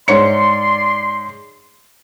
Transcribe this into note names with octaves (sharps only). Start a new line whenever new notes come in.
G#2 C#5 D5 C6 C#7